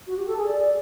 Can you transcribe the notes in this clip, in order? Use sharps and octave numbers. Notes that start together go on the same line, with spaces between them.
F#4
G4
A4
G#4
D5